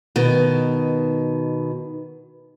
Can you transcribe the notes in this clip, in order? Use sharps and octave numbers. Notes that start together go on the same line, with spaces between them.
B2 D#3